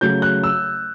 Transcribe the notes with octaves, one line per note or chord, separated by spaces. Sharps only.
C#3 F#3 A3 G6
F#6
E6